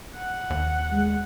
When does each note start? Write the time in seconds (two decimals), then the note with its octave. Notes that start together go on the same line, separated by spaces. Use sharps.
0.16 F#5
0.50 D#2
0.92 G#3